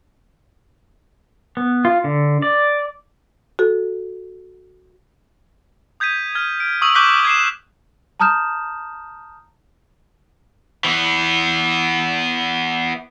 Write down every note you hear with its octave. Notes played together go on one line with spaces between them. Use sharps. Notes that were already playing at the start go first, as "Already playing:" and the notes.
B3
F4
D3
D5
F#4 A4
D#6 G6 G#6 B6 D#7
F6 G#6
D7
C#6 D#6 E6 F#7
C#6 D6 F#6 G6 B6 G7
G#6 C7 E7
A5 A#5 D#6 F6 G6 E7
E3 B3